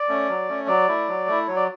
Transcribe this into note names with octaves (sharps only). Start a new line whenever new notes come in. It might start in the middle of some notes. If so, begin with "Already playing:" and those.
Already playing: D5
A3 C#4
F#3
A3 C#4
F#3 D5
A3 E4
F#3
A3 E4
F#3 C#5
D5